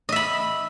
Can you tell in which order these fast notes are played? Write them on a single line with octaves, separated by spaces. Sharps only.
D#5 E5 B5